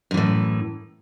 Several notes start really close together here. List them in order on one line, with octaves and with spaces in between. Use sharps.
F#2 E3 A2